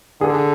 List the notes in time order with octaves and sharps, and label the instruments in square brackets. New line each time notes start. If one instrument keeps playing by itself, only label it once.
[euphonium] D3 [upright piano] G#4